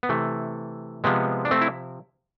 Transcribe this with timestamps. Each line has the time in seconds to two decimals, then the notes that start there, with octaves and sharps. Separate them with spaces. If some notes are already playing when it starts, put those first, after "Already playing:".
0.03 B3
0.09 C3 E3 A3
1.04 C3 F3 G#3 B3
1.45 D4
1.51 A3 C4
1.61 E4